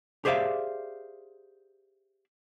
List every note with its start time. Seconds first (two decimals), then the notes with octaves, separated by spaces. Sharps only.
0.25 G4 G#4 C5 D5 E5 F5